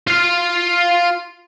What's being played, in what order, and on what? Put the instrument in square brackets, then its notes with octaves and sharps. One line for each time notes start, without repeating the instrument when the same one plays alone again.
[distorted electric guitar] F4 F5